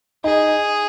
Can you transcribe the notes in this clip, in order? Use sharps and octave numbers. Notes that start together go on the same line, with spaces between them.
D#4 G#4